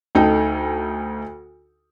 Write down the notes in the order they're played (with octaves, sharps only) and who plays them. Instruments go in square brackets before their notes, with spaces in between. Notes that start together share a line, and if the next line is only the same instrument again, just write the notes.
[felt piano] D2 D#4 A4 G5